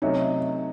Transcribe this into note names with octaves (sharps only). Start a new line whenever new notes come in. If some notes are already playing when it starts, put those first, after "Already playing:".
C3 F#3 A3 C#4 D#4